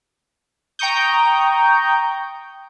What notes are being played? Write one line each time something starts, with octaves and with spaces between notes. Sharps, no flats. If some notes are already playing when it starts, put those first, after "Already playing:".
G5 A#5 C#6 D#6 G6